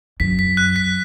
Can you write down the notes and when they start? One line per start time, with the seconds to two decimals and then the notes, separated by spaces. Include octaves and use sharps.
0.20 F#2 B6
0.39 B6
0.57 F#6
0.76 B6